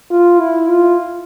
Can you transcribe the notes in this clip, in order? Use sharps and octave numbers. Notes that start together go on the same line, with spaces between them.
F4
E4
F4